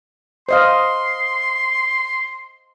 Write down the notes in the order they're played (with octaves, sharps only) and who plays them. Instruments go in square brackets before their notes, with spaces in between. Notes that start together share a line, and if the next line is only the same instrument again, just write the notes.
[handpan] C5 D#5 F5 [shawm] C6